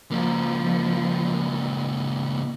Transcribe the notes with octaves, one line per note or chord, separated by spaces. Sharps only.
C#2 F3 A#3